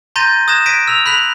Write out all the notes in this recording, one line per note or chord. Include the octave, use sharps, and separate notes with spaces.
A#5 C6 G6 A6 A#6 D#7
D#6 F#6 G#6 A#6 E7
G#6 A#6 B6 D7 D#7
E6 F7
B5 F#6 B6 F7